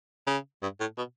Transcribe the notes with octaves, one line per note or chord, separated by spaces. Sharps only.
C#3
G2
A2
B2